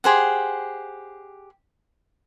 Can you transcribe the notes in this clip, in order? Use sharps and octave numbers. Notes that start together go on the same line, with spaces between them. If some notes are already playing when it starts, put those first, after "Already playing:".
G4 G#4 C5 F#5